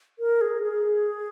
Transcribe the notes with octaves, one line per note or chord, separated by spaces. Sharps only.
A#4
G#4
G#4